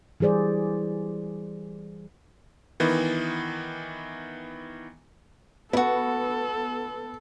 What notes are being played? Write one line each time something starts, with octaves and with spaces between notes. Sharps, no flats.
E3 G3 G#4 C5 D5
D#3 E3 B3
B3 E4 F#4 A4